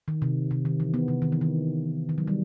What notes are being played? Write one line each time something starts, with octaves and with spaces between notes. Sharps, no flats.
D#3
C3
C3
D#3
E3
B3
C3
D#3
E3
D#3
D#3
F#3
G3